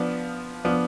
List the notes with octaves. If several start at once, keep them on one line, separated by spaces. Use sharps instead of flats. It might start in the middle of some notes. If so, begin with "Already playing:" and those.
Already playing: F3 B3 D4
F3 B3 D4